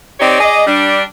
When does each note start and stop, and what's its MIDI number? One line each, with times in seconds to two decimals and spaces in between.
0.20 0.36 60
0.20 0.36 63
0.20 0.36 67
0.20 0.36 73
0.20 0.36 74
0.40 0.65 68
0.40 0.65 74
0.40 0.65 75
0.66 1.03 55
0.66 1.03 62